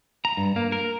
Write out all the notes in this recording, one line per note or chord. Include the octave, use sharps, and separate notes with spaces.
A#5
G2
A#3
A#4